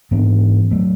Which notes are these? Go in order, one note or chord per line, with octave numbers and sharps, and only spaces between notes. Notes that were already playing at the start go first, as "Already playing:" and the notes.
G#2 E3 B3 D4
A2 F#3 A3